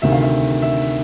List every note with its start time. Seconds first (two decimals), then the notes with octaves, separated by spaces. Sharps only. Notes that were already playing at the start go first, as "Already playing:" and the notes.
0.02 D2 C3 D#3 E5
0.13 F5
0.23 E5
0.62 E5